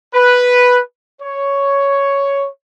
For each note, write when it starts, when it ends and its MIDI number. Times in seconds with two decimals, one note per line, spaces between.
0.14 0.80 71
1.21 2.48 73